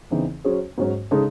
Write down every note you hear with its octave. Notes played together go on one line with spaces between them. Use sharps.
E2 C#3 E3 C4 D#4
F#3 C#4 G#4 C5
G#2 F#3 C#4 F#4
C#3 G#3 D#4 A4